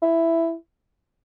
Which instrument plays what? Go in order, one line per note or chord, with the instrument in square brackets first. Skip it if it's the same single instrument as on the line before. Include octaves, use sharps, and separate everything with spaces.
[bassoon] E4